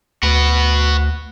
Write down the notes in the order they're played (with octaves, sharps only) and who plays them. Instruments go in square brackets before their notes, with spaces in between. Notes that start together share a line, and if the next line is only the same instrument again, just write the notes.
[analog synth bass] D2 [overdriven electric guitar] F#4 B4